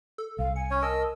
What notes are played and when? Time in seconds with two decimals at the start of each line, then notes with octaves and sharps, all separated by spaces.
0.18 A4
0.39 C2 F5
0.56 G#5 C#7
0.71 C#4 C#5
0.82 A#4 D#5 A5 E6